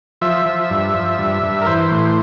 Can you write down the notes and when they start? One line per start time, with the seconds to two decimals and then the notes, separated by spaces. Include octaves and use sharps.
0.21 F3 E5
0.46 F3
0.70 G2
0.94 F3
1.19 G2
1.43 G2
1.62 A#4
1.66 E3 C5
1.91 A2